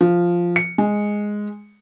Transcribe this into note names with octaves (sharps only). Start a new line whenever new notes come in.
F3
C#7
G#3